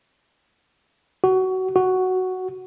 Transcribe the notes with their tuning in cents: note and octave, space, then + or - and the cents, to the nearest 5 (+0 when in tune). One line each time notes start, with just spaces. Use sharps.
F#4 +20
F#4 +5